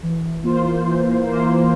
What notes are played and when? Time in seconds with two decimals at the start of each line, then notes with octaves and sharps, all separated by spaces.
0.03 E3
0.44 A#3 F4 C5
0.85 E3
1.27 A#3 F4 C5